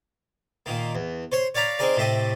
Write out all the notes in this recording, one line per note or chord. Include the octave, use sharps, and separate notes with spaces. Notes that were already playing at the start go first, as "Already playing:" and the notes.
A#2 D#3 A#3
E2
C5 C#5 C6
C#5 D5 F5 A#5 B5
C4 D#4 G#4 A#4 D5
A2 C3 A3 G4 D#5